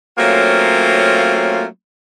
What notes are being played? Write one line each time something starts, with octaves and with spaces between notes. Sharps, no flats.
F#3 A3 A#3 C4 C#4 F4